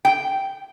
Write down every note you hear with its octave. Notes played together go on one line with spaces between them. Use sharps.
G5